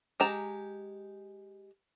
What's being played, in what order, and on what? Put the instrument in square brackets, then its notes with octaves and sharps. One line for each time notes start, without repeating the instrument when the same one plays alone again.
[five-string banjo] G#3 G4 A5 A#5